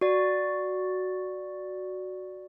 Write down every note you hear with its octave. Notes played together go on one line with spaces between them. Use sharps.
F#4 D5